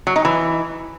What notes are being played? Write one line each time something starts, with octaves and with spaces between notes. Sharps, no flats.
F#3
D#4
E3